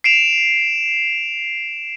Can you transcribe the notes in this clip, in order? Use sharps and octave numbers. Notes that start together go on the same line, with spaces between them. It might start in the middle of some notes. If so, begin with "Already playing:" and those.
C7 D7 E7 F7